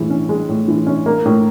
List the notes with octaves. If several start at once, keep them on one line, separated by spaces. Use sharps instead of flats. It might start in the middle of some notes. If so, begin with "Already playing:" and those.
Already playing: A2 E3 G#3
C#4
G#3
A2
E3
C#4
A#3
A2